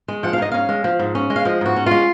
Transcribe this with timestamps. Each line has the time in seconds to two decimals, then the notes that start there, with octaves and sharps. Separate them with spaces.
0.08 G#3
0.23 F3 F#5
0.33 F5
0.38 G#2 D#5
0.52 C#4 F5
0.69 G#3
0.84 F3
0.99 G#2
1.15 C#4
1.30 G#3
1.36 F5
1.45 F3 D#5
1.61 G#2 F#4
1.76 C#4
1.86 G#3 F4